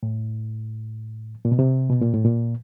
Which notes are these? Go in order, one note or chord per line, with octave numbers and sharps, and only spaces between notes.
A2
A#2
B2
C3
B2
A#2
A2
A#2